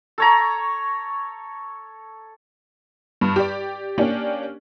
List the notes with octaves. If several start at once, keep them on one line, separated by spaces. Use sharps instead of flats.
A4 C#5 A#5
G2
G4 D5
A#3 C#4 D4 G4